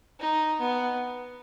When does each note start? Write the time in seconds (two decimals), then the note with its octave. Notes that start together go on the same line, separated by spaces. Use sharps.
0.20 D#4
0.60 B3